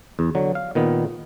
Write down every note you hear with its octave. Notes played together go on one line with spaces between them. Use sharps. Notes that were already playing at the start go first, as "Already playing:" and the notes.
E2
D3 F#3
F5
A#2 D#3 B3